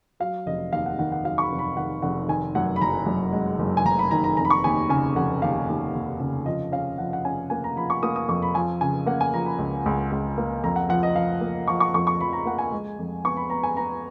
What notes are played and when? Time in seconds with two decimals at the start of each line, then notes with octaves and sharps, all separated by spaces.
0.20 F#3 F5
0.46 F1 D#5
0.72 D#2 F5
0.86 F#5
0.99 D#3 F#5
1.12 F#5
1.24 F#3 F5
1.38 C#6
1.42 B5
1.51 F1
1.59 B5
1.77 D#3 F#5
2.02 F1 F#5
2.28 D#3 G#5
2.55 F#2 F#5
2.76 B5
2.81 F#1 A#5
3.07 F#2
3.33 G#3
3.59 F#1
3.77 G#5
3.85 F#1 A#5
3.99 B5
4.11 D#3 A#5
4.24 A#5
4.37 F1 A#5
4.45 B5
4.50 C#6
4.64 D#2 G#5
4.89 C#3 G#5
5.15 F1 F#5
5.42 D#2 F5
5.69 D#2
5.95 D#2
6.20 C#3
6.46 F3 D#5
6.72 C#4 F5
6.98 F3 F#5
7.13 F#5
7.25 C#4 G#5
7.50 A#3 G#5
7.64 A#5
7.76 F3 B5
7.90 C#6
8.03 A#3 D#6
8.16 D#6
8.28 F2 C#6
8.42 B5
8.54 F3 G#5
8.81 C#3 G#5
9.06 A#3 F#5
9.21 G#5
9.33 F3 A#5
9.46 B5
9.59 C#2
9.86 C#2
10.12 C#2
10.38 A#3
10.64 F2 A#5
10.76 F#5
10.89 F3 F#5
11.03 D#5
11.15 F3 F5
11.41 A#3
11.68 F3 C#6
11.80 C#6
11.94 F2 C#6
12.07 C#6
12.20 F3 B5
12.33 A#5
12.45 A#3 F#5
12.58 G#5
12.72 G#3
12.99 F2
13.24 B3 C#6
13.37 B5
13.50 B3 A#5
13.63 G#5
13.77 B3 A#5